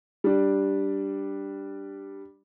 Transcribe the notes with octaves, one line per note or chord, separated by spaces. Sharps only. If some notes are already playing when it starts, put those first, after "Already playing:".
G3 D4